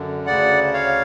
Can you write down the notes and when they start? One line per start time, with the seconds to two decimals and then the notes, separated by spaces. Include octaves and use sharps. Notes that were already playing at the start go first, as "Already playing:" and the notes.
Already playing: F#2 D3
0.26 D2 C#3 D5 F#5
0.73 C#5 F5